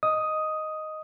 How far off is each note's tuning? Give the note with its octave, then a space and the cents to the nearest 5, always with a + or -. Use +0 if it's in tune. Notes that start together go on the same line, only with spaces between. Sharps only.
D#5 +0 D#6 +5